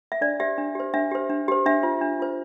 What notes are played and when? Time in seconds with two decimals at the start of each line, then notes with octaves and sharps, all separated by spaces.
0.12 E5
0.21 D4 D5
0.40 G4 C5 E5
0.58 D4
0.75 G4 C5
0.94 D4 E5
1.11 G4 C5
1.30 D4
1.48 G4 C5
1.66 D4 E5
1.83 F4 C5
2.01 D4
2.19 F4 C5